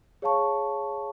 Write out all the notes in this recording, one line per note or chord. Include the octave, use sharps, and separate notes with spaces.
G#4 C#5 F5 A5 C#6